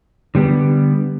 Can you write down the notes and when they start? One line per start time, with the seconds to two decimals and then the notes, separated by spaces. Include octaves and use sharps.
0.35 D3 G3 B3